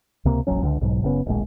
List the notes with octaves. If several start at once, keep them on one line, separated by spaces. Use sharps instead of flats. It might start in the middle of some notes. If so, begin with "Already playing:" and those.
C#2 C3 A#3
E1 A#1 F#3 C#4
C#2 D3
B1 G#2 B2 F#3
F#1 C#3 B3 C#4
D1 A#1 G#3